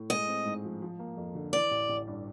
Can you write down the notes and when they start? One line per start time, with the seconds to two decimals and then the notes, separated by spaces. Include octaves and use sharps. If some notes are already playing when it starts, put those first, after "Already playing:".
Already playing: A2
0.10 G#3 D#5
0.28 C4
0.45 G#2
0.64 F3
0.82 F3
0.99 A#3
1.17 F2
1.35 D3
1.53 E3 D5
1.71 A1
1.89 A1
2.07 G2